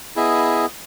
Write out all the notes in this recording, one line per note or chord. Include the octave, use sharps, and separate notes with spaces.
B3 E4 G#4 D#5